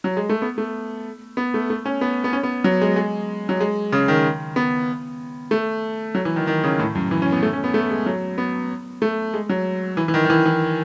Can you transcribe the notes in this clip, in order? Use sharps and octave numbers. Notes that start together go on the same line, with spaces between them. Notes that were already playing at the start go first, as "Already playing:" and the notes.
F#3
G#3
A3
B3
A3
B3
A3
A3
C#4
B3
B3
C#4
B3
F#3
G#3
G#3
F#3
G#3
C#3
D#3
B3
A3
F#3
E3
D#3
D#3
C#3
A2
F#2
E3
C#4
B3
A3
C#4
B3
A3
G#3
F#3
B3
A3
G#3
F#3
E3
E3
D#3
D#3
E3
E3